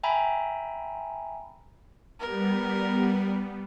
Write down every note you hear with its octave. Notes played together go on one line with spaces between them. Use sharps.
E5 G5 G#5 A#5 B5
G3 B3 A#4